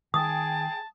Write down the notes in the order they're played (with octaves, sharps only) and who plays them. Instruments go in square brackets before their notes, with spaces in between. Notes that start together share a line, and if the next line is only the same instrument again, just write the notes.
[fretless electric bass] D#3 [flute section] G#4 G5 [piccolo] A5 [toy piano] D#6